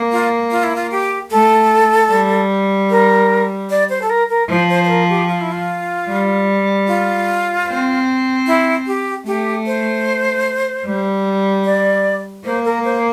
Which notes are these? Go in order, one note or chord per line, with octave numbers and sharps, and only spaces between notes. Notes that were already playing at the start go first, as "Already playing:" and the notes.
Already playing: A#3
F4
F4
E4
F4
G4
A3 A4
G3
A#4
D5
C5
A4
A#4
A#4
F3 C5
C5
C5
A#4
G4
F4
E4
F4
G3
F4
C4
E4
G4
A3 G4
C5
G3
D5
A#3 C5
A#4
C5